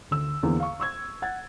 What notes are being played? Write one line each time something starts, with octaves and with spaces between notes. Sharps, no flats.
D2 E6
E2 D3 A#3 C4 E4
F5 C#6
C#6 E6 G#6
F#5 G#6 A6